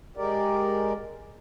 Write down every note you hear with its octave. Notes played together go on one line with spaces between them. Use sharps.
G#3 G4 A#4 D5